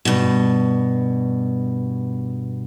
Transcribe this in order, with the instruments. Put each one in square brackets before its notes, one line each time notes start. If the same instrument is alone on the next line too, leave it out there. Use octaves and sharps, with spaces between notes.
[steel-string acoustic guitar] G2 B2